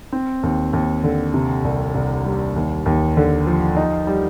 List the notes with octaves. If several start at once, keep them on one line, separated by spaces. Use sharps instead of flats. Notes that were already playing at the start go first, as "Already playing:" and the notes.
C4
D#2
D#2
D3
C3
C2
C2
G3
D#2
D#2
D3
F3
D#4
G3